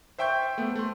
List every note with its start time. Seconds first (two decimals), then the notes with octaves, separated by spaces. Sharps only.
0.18 C5 E5 G5 C6 C#6 G6
0.58 A3 B3
0.76 A3 C6